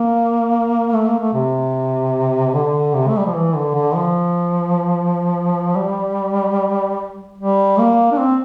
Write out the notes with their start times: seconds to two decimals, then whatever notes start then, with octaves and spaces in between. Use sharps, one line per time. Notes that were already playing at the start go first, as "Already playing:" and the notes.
Already playing: A#3
0.94 A3
1.07 A#3
1.20 A3
1.34 C3
2.55 D3
2.94 C3
3.09 A3
3.17 G3
3.27 F3
3.35 E3
3.56 D3
3.75 D3
3.95 F3
5.77 G3
7.38 G3
7.78 A#3
8.12 D4
8.18 C4